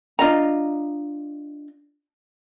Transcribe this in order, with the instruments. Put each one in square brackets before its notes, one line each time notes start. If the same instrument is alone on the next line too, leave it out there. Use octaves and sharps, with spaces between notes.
[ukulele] D4 F4 D#5 A#5